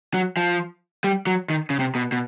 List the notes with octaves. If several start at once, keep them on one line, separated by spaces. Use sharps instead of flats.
F#3
F3
G3
F#3
D#3
C#3
C3
B2
B2